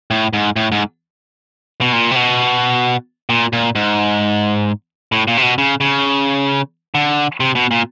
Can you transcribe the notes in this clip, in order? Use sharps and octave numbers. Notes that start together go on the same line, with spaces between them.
A2
G#2
A2
G#2
B2
A#2
C3
B2
A#2
A#2
G#2
A2
A#2
C3
B2
C#3
C#3
D3
C3
B2
A#2